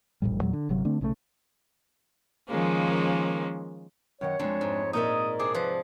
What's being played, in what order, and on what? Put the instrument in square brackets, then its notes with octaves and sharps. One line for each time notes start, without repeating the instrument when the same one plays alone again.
[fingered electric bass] E1 A#1 A2 G3
E2 A#2 F#3 G#3
D3
G1 C3 F#3
D3 A3 C4 D4
B1 C#3 E3 A3
[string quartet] D#3 F3 G#3 A#3 C#4
[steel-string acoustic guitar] F#2 D#3 F#5 [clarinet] C#5
[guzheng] F2 [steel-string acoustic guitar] G#3 D4
[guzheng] G#2
[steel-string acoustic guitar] A#2 A#4 D5 [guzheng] D#4 C#5 E5 [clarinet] D#6
[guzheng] C3 D4 G#4 [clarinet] D6
[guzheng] F3 [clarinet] B4